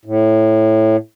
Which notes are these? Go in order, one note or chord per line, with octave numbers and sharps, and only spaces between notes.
A2